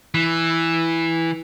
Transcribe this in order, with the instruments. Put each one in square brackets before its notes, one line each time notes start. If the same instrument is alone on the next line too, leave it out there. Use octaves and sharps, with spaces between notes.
[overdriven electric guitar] E3